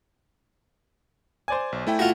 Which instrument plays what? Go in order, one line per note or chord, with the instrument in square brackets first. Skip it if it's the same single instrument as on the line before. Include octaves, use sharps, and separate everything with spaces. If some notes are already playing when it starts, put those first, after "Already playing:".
[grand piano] C5 D5 G#5
[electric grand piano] B1
A3 E4 G5
[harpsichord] F4 F#4